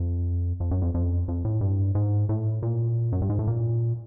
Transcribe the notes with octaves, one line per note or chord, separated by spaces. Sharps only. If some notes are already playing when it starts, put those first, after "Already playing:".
Already playing: F2
F2
F#2
F2
F2
F2
A2
G2
G#2
A2
A#2
F#2
G2
G#2
A2
A#2